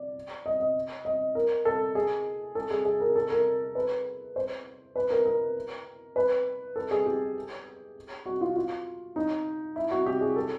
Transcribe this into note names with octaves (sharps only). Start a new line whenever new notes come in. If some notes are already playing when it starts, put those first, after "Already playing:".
Already playing: D5
D#5
D#5
D#5
A#4
A4
G#4
A4
G#4
G#4
A#4
A4
A#4
B4
C5
B4
A#4
A#4
B4
A4
G#4
G4
F#4
F4
F4
D#4
E4
F#4
G4
G#4
A4